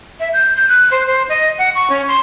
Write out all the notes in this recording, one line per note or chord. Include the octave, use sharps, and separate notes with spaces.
E5
G6
G6
F#6
C5
C5
D#5
F#5
C#6
C#4
C6